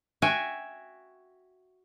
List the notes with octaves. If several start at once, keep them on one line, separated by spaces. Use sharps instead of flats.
F#4 E5 G5 G#5